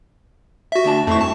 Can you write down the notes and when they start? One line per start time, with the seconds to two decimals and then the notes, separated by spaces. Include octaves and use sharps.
0.72 F#4 E5
0.84 D2 D4 A5
1.07 F2 A3 C4 E4 C#6
1.21 G2 A5